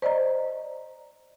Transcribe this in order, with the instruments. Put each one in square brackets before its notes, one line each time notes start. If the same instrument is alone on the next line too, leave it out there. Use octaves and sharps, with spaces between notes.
[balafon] C5 D5 D#5 A#5